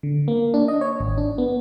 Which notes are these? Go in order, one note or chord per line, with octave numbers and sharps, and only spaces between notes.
D3
A#3
D4
D#5
C#5
G#1
D4
B3